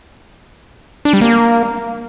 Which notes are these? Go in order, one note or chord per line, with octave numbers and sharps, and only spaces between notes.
D4
G3
A#3